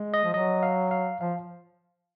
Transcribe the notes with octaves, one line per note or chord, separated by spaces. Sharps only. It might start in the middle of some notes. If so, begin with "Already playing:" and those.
Already playing: G#3
D#5
F3
F#3 D#5
F5
F5
F3 F5